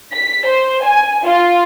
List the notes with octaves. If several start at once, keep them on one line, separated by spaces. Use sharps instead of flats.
B6
C5
G#5
F4